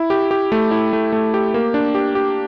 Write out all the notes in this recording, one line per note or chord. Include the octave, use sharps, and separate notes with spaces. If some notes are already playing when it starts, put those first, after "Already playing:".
Already playing: E4
G4
G4
A3
E4
A3
A3
G4
A#3
D4
G4
G4